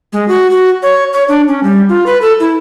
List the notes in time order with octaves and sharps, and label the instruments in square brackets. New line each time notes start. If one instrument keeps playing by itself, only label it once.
[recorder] G#3
F#4
F#4
C#5
C#5
D4
C#4
G3
F4
B4
A4
E4